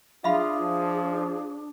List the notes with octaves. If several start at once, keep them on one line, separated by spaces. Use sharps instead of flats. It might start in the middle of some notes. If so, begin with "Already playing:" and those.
D4 F4 G#4 E5 F5 B5
F3